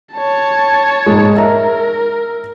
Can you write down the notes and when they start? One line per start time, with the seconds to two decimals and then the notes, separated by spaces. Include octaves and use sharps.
0.14 C#5 A5
1.06 G#2 G#3
1.37 A#4 E5 A#5